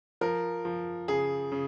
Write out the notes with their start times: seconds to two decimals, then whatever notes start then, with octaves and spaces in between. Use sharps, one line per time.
0.21 F3 A#4
0.65 F3
1.08 C#3 G#4
1.52 C#3